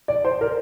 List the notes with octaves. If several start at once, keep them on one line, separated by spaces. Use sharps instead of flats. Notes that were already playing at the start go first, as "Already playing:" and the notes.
D5
C5
A#4